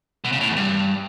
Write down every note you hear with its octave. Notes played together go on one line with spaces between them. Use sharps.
B2
C#3
A2
E2
G2